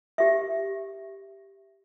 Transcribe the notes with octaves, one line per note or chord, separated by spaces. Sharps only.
G4 E5